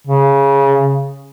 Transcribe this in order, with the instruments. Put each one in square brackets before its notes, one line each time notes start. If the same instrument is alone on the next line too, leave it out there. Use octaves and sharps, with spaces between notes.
[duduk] C#3